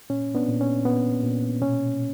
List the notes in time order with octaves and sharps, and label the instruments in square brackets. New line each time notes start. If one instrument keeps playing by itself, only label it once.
[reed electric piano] A#2 C#4
B3 D4
A#2
C#4
A#2 B3
A#2
B2 C#4